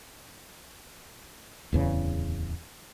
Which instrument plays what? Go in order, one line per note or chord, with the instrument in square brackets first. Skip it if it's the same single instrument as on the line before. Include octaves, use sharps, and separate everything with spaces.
[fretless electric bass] D1 E2 C#3